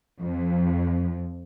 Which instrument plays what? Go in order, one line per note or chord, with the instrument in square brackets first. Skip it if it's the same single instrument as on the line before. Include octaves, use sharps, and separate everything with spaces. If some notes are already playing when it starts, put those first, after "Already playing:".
[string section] F2